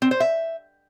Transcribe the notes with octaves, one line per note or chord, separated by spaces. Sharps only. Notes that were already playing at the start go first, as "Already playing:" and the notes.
C4
C5
E5